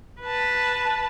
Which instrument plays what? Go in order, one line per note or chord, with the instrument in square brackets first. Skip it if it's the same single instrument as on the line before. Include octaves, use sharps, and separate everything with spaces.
[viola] B4 A5